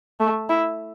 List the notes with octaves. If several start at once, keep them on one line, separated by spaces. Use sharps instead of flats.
A3
E4